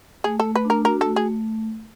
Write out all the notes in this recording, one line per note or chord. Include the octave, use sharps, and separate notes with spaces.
A3 G#4
A4
A3
B4
D4
A#4
F#4 A#4
A4
A3
G#4
A3